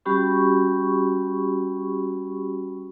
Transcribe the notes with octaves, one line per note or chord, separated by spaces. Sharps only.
G3 C#4 F#4 G4 B5 C#6